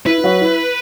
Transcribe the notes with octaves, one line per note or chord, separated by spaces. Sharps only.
E4 B4
E4
F#3 F#4
E4